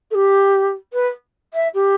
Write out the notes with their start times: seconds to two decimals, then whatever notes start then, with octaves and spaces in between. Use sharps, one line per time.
0.11 A4
0.14 G4
0.93 B4
1.53 E5
1.74 G4